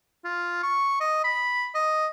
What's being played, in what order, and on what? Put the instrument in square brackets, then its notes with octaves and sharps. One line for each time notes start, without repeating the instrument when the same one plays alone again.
[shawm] F4
C#6
D#5
B5
D#5